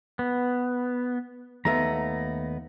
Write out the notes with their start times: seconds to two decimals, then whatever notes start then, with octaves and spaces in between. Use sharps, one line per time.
0.19 B3
1.65 D#2 A3 B3 A#5